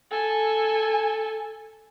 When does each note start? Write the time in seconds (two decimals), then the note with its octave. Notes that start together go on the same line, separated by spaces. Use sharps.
0.11 A4 G#5